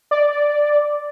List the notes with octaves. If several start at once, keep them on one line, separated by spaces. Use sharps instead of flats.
D5